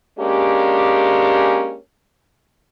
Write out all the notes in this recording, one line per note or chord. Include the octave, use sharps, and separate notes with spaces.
G#3 A#3 C#4 D4 G4